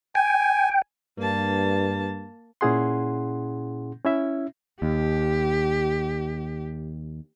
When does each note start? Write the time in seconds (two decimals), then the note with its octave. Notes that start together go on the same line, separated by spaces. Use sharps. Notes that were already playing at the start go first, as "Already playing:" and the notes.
0.15 G5 G#5
1.18 G2 A#3 A5
2.61 A#2 C#4 E4 G#4 F#5 C6
4.05 C#4 E4 E5
4.82 D#2 G4